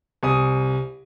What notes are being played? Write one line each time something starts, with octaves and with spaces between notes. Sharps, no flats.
C2 G#5 D#6